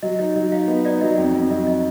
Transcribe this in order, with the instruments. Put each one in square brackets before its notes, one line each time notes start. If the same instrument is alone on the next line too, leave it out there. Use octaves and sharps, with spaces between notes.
[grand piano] F#3 [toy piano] D#5
[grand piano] D#4 [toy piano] D#5
[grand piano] F#3 [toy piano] D#5
[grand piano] D#4 [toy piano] F5
[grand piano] B3
[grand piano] D#4 [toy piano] D5
[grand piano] F#3 [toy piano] D#5
[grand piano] F2
F2
[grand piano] F#3 [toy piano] D#5
[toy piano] D#5